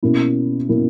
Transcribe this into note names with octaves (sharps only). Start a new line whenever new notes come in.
B2 A#3 C#4 E4
B2 A#3 C#4 E4